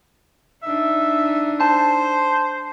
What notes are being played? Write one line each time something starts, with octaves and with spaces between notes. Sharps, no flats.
D4 D#4 E5
C5 A5